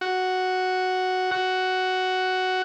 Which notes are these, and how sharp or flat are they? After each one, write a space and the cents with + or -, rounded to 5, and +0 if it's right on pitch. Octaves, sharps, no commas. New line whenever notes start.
F#4 +0
F#4 +5